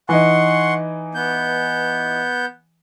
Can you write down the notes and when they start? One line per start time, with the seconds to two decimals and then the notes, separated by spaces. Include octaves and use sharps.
0.09 E3 D#4 F#5 C6 C#6
1.15 B3 G6